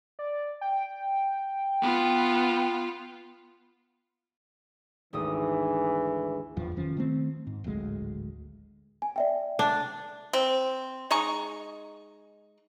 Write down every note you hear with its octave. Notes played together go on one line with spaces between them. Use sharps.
D5
G5
B3 F4
G#1 D2 E3 D#6
F#1 E2 G2 F3
F1 D#3 F3 C#4
D#3 A3 C4
G#2
D1 G#1 D2 G#3
G#5
D5 E5 G5
D4
C4
G#3 D#4 A#5 C#6